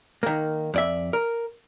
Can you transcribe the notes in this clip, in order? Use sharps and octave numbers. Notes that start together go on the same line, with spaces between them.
D#3 A#3
F2 D5 E5
A#4